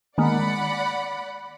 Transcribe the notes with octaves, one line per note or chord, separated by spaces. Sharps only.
D#3 G#3 A#3 D5 F#5 B5